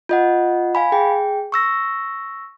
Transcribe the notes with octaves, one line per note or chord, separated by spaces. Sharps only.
F4 D#5 F#5
F5 G#5 B5
G#4 G5
C#6 E6 A#6